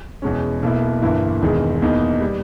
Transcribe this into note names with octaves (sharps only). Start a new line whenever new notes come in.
E2 B2 G#3 C#4
B1 B2 A#3 E4
G1 G2 E3 A#3 E4
E1 E2 D#3 G#3
E2 B2 A#3 D#4
G3